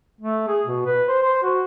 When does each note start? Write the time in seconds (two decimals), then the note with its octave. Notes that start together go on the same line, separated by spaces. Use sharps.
0.21 A3
0.47 G#4
0.66 B2
0.86 B4
1.08 C5
1.22 C5
1.42 F#4